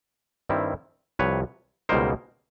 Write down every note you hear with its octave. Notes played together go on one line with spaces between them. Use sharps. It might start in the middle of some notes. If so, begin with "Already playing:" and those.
G2 D#3 G3 C4 E4
C2 C3 F3 B4 C#5
C#2 B2 G3 A#3 D#4 A#4 C5